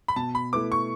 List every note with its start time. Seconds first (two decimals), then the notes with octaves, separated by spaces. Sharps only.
0.08 B5
0.16 B2 A5
0.35 B5
0.53 A3 E4 B4 D6
0.72 C#6